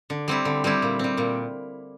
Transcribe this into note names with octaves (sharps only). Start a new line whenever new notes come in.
D3
G3 C4 E4
D3
G3 C4 E4
A#2
G3 C4
A#2